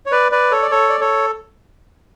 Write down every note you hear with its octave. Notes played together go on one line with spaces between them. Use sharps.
C#5
B4 D5
B4 D5
A4 C#5
D5
A4 C#5
D5
A4 C#5